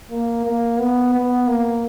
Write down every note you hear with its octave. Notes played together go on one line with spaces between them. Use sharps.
A#3
A#3
B3
B3
A#3